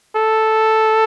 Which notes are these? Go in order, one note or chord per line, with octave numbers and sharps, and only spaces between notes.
A4